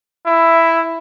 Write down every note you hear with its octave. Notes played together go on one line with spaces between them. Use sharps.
E4